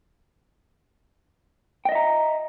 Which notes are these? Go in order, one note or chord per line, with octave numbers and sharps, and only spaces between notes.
D#5 E5 G5 A#5